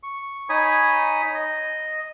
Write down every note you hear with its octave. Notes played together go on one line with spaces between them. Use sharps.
C#6
D#4 C#5 G#5 B5 D#6
D#5